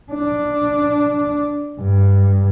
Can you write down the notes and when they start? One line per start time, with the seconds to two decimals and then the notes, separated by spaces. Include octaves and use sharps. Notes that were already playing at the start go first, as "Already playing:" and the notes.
0.12 D4
1.80 G2